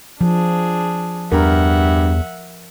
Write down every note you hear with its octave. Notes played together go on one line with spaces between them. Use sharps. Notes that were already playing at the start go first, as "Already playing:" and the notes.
F3 D4 G#4
E2 G2 A#4 E5 F#5